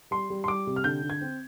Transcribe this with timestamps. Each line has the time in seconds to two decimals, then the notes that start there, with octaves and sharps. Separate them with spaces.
0.11 G3 C6
0.30 G3
0.44 C6
0.48 G3 D6
0.67 C3
0.76 F6
0.84 D3 G6
1.03 D3
1.10 G#6
1.21 C4